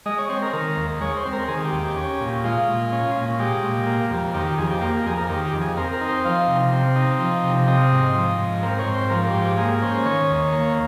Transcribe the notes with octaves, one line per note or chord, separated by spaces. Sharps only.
G#3 D#5
C#5
C4 C#5
A#4
D#3 A#4
D#2
G#3 C#5
C5
C4
A#4
D#3 G#4
G4
D#2
G4
C#4
A#2
G#3 F4
A#2
C#4
A#2
G#3 G4
A#2
A#3
F2
D#3 G4
G4
F2 G#4
G4
A#3 G4
F2 G#4
A#4
D#3 G4
G4
F2
G#4
C4 A#4
A#4
D#4
C5
F3 F5
C3
C4
D#4
F3
C3
C4 D#5
G#2
F3
G#2
C4 A#4
C#5
G#2
C5
F3 A#4
G4
G#2
G4
A#3 G#4
C#4 C5
D#3 C#5
D#2
A#3